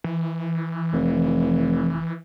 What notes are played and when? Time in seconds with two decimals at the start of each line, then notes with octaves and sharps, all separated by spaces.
0.04 E3
0.93 F1